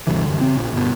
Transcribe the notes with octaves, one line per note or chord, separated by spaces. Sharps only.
D2 G2 C3 E3
F#2 D3
C#3 C4
A#1
G1 B2